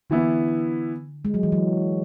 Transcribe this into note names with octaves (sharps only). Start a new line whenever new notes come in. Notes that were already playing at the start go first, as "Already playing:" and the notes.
D3 E3 B3 E4
G#3
F#3
E3
F#3